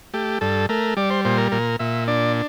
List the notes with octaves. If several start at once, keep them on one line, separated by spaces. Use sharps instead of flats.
A3 G4
G2 A4
A3 A#4
G3 D5
C5
A#2 C5
A#4
A#2 A#4
A#2 E5
D4 D5